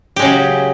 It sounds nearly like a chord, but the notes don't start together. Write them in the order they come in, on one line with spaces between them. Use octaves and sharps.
G4 G#3 C#3 F#3